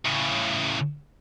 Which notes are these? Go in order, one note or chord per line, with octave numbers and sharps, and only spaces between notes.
A2 C#3